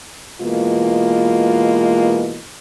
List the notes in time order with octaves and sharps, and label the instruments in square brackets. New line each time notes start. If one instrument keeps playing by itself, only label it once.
[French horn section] B2 E3 G#3 A#3 F4